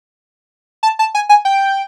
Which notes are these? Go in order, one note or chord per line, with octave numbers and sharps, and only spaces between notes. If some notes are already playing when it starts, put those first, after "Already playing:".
A5
A5
G#5
G#5
G5